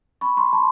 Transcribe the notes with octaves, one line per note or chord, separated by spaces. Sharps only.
B5 C#6
A#5 C6
A5 B5